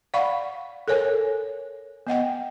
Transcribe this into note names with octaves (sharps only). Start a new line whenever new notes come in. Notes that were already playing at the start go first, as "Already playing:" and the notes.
D5 F5 F#5 B5 C#6
A4 A#4 C#5 G#5
B3 D#5 F#5 G5